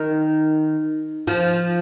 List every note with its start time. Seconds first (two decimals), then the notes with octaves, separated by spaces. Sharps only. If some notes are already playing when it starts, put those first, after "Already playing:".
Already playing: D#3
1.27 F3